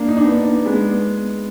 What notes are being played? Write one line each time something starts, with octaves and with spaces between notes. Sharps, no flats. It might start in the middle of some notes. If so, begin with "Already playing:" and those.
Already playing: A#3 D4
D#4
D4
B3 D#4
G#3 B3